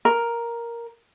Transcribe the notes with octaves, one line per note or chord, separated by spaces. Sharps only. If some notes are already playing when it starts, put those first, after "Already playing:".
A#4